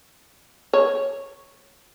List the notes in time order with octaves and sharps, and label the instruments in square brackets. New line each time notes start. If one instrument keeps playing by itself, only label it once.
[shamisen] C#5